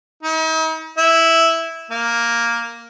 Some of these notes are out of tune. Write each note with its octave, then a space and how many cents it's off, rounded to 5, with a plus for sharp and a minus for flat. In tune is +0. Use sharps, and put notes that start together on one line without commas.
D#4 +45
E4 -5
A#3 +0